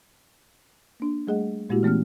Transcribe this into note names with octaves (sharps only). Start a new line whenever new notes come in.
A#3 D4
G3 A3 G#4 D#5 F#5
A#2 G#3 A#3 E4 F#4 G4
E3 A3 B3 C#4 F6